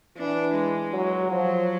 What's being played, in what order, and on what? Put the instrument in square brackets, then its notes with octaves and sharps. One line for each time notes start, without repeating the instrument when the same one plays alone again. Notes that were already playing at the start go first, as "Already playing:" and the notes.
[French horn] E3 [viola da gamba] D4
[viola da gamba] G#3
[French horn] F#3
[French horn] F3 [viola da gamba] F#3